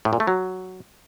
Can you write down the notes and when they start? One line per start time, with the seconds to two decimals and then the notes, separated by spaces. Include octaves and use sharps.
0.05 A2
0.13 A#2
0.20 A3
0.27 F#3